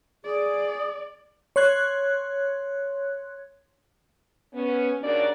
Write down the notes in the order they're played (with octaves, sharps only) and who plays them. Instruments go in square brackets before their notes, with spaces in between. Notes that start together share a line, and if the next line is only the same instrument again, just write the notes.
[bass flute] G#4 [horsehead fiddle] D5
[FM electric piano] C#5 C6 F#6 G#6
[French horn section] B3 C#4
D#2 C#3 D4 F#4 A#4 D5